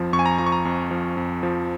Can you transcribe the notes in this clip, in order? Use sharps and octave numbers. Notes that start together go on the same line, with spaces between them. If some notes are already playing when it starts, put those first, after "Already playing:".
Already playing: F2 F3
F2 C#6
G#5
A#5
F3 A#5
C#6
A#5
F2
F3
F2
F3